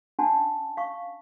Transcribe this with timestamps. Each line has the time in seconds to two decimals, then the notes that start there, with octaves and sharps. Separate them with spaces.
0.19 C#4 D4 F#5 G#5 A5 C6
0.77 F5 C#6